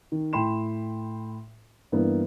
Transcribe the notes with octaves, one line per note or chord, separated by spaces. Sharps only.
D#3
A2 G5 B5 C6 E7
G2 E3 A#3 B3